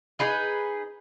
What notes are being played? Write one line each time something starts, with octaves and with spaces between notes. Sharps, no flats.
D#4 G#4 B4 D#5